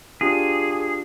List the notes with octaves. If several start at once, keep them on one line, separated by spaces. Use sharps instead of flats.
D4 F4 G4 G#4